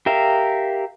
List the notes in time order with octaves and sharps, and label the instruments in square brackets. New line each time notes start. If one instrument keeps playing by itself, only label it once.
[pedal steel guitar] G4 A#4 E5 F5